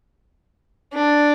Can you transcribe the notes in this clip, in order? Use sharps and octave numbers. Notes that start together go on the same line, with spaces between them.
D4